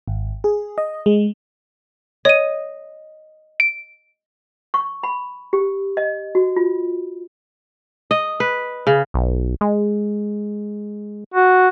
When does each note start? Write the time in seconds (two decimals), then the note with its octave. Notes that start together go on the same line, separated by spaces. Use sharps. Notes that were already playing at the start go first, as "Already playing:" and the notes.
0.08 G#1
0.44 G#4
0.78 D#5
1.06 G#3
2.25 C#5 D#5 D#7
3.60 D7
4.74 C#6
5.03 B5
5.53 G4
5.97 D#5
6.35 F#4
6.56 F4
8.11 D#5
8.40 B4
8.87 C#3
9.14 B1
9.61 G#3
11.34 F#4